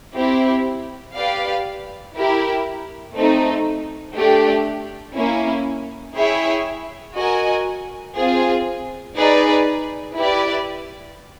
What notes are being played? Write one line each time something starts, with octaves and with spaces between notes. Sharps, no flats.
C4 E4 G4
G4 B4 D5 F5
E4 G4 A#4
A3 C4 D#4
A3 D4 G4
A#3 C#4 E4
E4 G#4 C#5 E5 G5
F#4 A#4 D#5 G#5
C4 F4 G#4
D#4 G#4 B4 D5
E4 G4 B4 D5